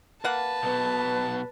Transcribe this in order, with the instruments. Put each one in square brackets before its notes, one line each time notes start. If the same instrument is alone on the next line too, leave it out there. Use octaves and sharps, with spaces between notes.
[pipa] A#3 F#5 [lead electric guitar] B4 [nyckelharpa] A5
[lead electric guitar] B1 B2 [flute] B4